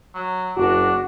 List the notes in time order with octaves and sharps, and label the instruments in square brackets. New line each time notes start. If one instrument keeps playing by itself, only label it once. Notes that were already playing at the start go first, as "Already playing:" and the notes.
[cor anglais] F#3
[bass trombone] F#1 [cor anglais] D4 [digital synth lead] F#4